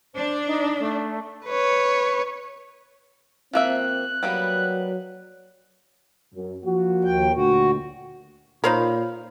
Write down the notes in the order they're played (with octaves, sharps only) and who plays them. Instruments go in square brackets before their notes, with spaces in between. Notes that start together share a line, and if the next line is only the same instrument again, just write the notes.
[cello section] D4 [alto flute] C5
[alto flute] D#4
A3
[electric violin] B4 C#5
[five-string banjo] F3 A#3 E5 [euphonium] C4 [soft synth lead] F#6
[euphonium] F#3 [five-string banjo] G3 A#3 B3
[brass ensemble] F#2
F3 A#3 F#4
[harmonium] D#2 G5
[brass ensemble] D2 A#2 [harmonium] F#4
[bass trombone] A#2 [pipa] D#4 C5 F5 [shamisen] A#4 [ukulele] C#5 B5